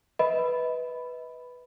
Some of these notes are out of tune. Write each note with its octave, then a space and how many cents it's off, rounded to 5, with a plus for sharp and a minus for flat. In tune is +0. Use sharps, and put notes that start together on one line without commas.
B4 +0 D#5 +40 B5 +5